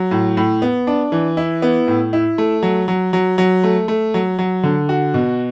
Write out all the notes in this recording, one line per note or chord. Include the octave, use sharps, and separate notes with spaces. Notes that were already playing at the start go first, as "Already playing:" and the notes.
Already playing: F#3
A2
A2
B3
D4
E3
E4
B3
A2
E4
A3
F#3
F#3
F#3
F#3
A3
A3
F#3
F#3
D3
F#4
B2